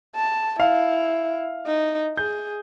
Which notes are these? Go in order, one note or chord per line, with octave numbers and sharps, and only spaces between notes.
A5
E4 F5
D#4
G#4 G6